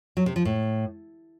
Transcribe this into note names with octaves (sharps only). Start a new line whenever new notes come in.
F#3
C3
F3
A2